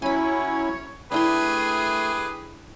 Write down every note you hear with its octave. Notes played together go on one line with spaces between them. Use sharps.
F#3 C#4 E4 C#5 G#5 B5
A3 D4 E4 G4 G#4 B4 C6